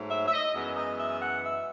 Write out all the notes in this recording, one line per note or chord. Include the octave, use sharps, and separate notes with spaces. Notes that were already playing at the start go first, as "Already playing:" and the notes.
Already playing: G#2 F#3 A3
E5
E5
D#5
F#2 E3 G#3 B3
D#5
E5
F#5
E5